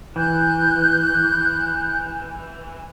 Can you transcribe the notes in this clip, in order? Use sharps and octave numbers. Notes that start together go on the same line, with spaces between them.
E3 F#6 G6